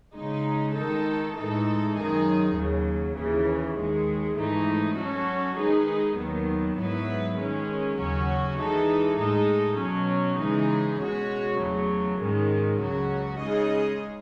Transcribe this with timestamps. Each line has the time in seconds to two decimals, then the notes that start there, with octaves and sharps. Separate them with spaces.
0.14 C#3 G#3 D#4
0.74 D#3 G#3 D#4 A4
1.35 A2 E3 G#3 D#4 A4
1.95 F#2 D#3 G#3 D#4 G#4
2.55 D#2 C#3 F#3
3.15 D#2 C#3 E3
3.76 D#2 D#3 G#3
4.36 G#2 E3 A3 D#4
4.96 F#3 C#4 F#4 A4
5.56 D#3 G#3 D#4 G#4 B4
6.17 D#2 D#3 F#3 B3
6.77 G#2 F#3 B3 E4 B4
7.37 D#3 G#3 C#4
7.97 D#2 C#3 F#3 C#4 F#4
8.57 E3 G#3 D#4 A4
9.18 A2 G#3 D#4 A4
9.78 B2 F#3 C#4
10.38 C#3 E3 G#3 D#4 G#4
10.99 B2 G#3 C#4 F#4 C#5
11.59 E2 C#3 F#3 A3
12.19 G#2 D#3 G#3 C#4
12.79 C#2 C#3 F#3 C#4 F#4
13.40 C#3 G#3 D#4 G#4 D#5